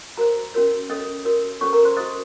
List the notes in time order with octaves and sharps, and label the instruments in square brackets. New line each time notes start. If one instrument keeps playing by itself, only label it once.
[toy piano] F#4 A#4 C5 A#5
C#4 F#4 A#4 C#5
C#4 A4 C#5 D#5 D#6
F#4 A#4 C#5
C#4 F#4 A4 C5 C#5 C#6
A#4 A#5
C5 C6
F#4 C5 D#5 D#6